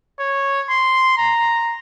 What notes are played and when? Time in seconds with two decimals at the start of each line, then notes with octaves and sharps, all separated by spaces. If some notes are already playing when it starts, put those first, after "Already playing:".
0.20 C#5
0.70 C6
1.18 A#5